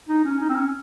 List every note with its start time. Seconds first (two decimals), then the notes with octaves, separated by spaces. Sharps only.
0.09 D#4
0.25 C#4
0.40 D#4
0.49 C4
0.56 C#4